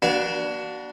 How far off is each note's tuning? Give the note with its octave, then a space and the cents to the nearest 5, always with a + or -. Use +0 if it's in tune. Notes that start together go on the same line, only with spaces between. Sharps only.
A#3 +45 D4 +0 F#4 +25